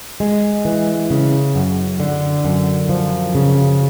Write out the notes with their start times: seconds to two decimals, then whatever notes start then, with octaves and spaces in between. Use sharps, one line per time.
0.20 G#3
0.65 E3
1.11 C#3
1.55 F#2
2.00 D3
2.45 F#2
2.89 F3
3.35 C#3